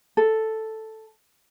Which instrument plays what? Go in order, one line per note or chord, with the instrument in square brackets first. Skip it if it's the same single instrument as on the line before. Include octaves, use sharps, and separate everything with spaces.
[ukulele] A4